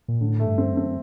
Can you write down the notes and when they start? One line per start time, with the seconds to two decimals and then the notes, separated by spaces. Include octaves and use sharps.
0.08 A#2
0.21 A2 D3
0.40 A3
0.46 G2
0.58 C4
0.71 F#2
0.77 C4